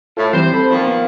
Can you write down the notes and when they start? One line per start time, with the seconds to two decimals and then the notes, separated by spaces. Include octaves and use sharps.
0.17 A2 F4 A4
0.33 E3 G3 C4 C5
0.53 C4 A4 B5
0.70 A#2 D#3 F3
0.87 B3